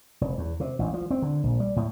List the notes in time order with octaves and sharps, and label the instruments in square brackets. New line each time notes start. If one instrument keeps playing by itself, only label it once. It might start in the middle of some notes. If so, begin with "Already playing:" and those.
[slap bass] F1
E2
C3
A1
F3
C4
D3
A#1
G3
A2